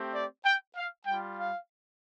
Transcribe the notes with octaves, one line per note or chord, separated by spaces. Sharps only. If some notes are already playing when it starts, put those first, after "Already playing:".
Already playing: A3 C4 G4
D5
G5
F5
G3 F4 G5
F5